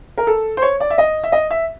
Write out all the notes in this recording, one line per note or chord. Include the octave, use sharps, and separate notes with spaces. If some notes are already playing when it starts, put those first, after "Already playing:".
A#4
A4
C5
C#5
D5
E5
D#5
E5
D#5
E5